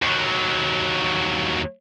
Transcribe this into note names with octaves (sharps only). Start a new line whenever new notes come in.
D#2 F#3